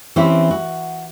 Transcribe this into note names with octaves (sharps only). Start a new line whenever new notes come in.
E3 C4 C#4 E4 G4
F#4